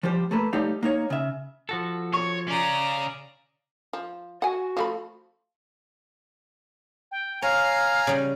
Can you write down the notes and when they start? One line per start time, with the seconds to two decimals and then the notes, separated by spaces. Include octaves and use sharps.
0.03 F3 G3 G4 C5
0.31 A3 A#3 A4 B4
0.53 G3 A3 D#4 G4 C#5 F5
0.83 A#3 D#4 C#5
1.10 C#3 E5
1.69 F3 F#4 A4
2.13 C#5 C#6
2.48 C#3 C#4 D5 A#5
3.93 F3
4.42 F#4 F#5 G#5
4.77 F3 A3 B5
7.11 G5
7.42 C#5 F5 G#5 A#5
8.07 C#3 G3